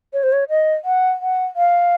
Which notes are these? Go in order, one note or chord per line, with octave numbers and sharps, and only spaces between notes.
C#5
C5
C#5
D#5
F#5
F#5
F5